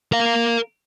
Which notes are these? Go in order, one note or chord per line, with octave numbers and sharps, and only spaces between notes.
A#4 F5